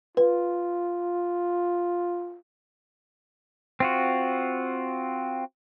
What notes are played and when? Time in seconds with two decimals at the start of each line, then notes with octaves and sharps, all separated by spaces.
0.17 F4 B4
3.80 C4 F4 F#4